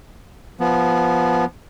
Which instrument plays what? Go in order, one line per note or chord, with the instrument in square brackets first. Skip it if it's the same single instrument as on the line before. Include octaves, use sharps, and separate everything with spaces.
[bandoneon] F3 B3